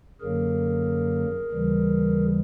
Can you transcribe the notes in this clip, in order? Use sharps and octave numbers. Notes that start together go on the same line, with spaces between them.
F#2 D3 F#3 A#3 G#4 A#4
D#2 C#3 E3 G3